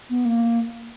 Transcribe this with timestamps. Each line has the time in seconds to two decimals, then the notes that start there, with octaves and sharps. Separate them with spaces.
0.10 B3
0.25 A#3